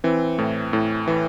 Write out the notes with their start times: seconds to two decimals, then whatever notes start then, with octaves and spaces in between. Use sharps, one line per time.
0.04 E3 C4
0.38 A2
0.73 A2
1.08 E3